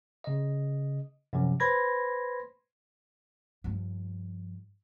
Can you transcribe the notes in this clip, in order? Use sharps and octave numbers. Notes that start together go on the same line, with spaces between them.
C#3 D#5
F#2 C3 F3
B4 C5 B5 C6 G#6 A#6
G2 F3